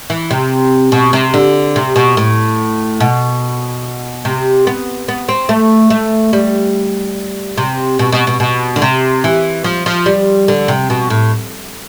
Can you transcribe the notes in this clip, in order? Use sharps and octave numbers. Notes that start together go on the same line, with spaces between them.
E3
C3
B2
C3
D3
C3
B2
A2
B2
C3
B3
B3
C4
A3
A3
G3
C3
B2
B2
B2
B2
D3
C3
E3
F3
F3
G3
D3
C3
B2
A2